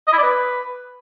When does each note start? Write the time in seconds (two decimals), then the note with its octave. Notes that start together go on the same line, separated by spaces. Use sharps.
0.08 D#5
0.13 E4
0.18 D5
0.23 B4